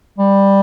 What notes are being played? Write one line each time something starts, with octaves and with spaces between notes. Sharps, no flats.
G3